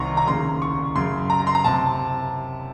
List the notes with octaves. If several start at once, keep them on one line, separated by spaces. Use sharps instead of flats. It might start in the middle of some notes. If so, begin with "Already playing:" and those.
Already playing: C2 C3 D#3 A#5 C6 C#6
A#5
D#2 C#3 C6
C#6
F#2 C#3 C6
A#5
C6
A#5
C3 A5